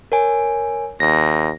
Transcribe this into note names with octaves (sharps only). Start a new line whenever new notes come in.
A#4 C#5 G#5
D#2 A#6